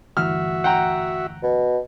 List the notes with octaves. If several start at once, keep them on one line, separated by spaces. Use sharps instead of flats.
G1 D2 E3 F#4 E5 F6
F#5 G5 A#5
B2